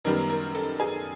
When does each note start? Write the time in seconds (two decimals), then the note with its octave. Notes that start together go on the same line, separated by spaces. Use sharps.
0.05 F#2 D#3 G3 B3 A#4
0.30 A#4
0.55 A4
0.80 G#4